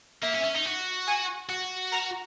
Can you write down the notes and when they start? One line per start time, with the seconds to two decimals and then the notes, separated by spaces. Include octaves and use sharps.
0.23 A#3 E5
0.34 C#4
0.44 C#4
0.55 D#4
0.65 F#4
1.07 G#5
1.50 F#4
1.92 A#5